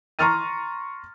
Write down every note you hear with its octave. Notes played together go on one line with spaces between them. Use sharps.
A#5 C6 C#6 F6 A6 D#7